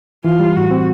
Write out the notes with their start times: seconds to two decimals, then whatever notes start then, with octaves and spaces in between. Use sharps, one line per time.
0.24 E3 F4
0.40 G3
0.56 A2 F#4
0.71 C4